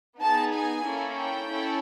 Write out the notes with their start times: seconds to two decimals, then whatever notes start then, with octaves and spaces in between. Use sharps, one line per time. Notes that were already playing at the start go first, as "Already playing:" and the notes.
0.20 B3 D#4 G#4 A5
0.52 G#5
0.85 A#3 C#4 E4 A4
1.18 G5
1.50 C#4 E4 A4